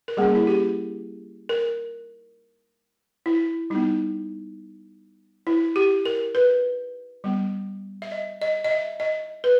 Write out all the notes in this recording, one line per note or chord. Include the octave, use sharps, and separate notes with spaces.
A#4
G3 A#3 C#4 G#4
E4
G4
A#4
E4
G3 B3 D#4
E4
G4
A#4
B4
G3 B3
E5
D#5
D#5
D#5
E5
D#5
B4